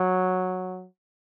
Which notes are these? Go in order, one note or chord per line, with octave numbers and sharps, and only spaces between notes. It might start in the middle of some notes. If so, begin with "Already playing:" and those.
Already playing: F#3